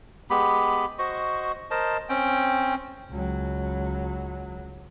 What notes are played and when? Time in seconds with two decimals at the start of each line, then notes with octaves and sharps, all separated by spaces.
0.30 G#3 B3 G4 B5
0.99 F#4 C5 D#5 C#6
1.71 A#4 C5 D#5 A5
2.09 C4 C#4 G5
3.11 C#2 F#3